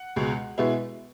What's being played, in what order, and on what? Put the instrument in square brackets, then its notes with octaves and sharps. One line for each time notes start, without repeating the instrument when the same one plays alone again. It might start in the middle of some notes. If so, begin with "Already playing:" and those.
Already playing: [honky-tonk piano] F#5
C#2 B2 G#3
B2 G#3 B3 E4